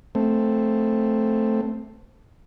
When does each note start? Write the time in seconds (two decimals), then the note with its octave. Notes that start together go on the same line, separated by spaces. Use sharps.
0.15 A3 C4